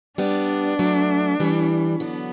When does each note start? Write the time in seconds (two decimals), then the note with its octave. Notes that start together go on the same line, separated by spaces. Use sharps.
0.18 G3 B3 D4
0.79 F#3 A3
1.40 E3 G3
2.00 D3 F#3 B3